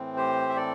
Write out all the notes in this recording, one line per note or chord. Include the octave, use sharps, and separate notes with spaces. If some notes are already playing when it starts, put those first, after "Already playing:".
Already playing: A2 E3 C4
G4 C5
E5
A4 D5